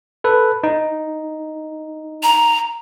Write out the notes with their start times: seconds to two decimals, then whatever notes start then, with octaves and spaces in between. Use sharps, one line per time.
0.24 A4 B4
0.64 D#4
2.23 A#5